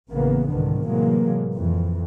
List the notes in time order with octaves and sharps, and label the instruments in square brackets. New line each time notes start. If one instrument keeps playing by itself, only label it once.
[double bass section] A1 C#3 E3 A#3 B3
C2 G#2 D3 D#3 B3
A2 C3 E3 F#3 G#3 A#3
F2 E3